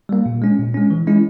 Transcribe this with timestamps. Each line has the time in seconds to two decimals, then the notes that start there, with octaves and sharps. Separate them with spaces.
0.09 G3 A#3
0.26 A#2
0.42 G#3 C#4
0.59 A#2
0.74 G#3 C#4
0.90 E3
1.07 G#3 C#4 E4